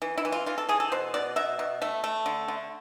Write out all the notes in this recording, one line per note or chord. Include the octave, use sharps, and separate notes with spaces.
E3
E4
E3
F4
E3 F4
A4
E3 G#4
A4
B2 C5
B2 D5
B2 E5
B2
A3 E5
A3
D3
D3